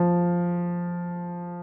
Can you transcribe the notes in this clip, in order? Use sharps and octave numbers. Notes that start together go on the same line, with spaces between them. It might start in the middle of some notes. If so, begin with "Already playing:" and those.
Already playing: F3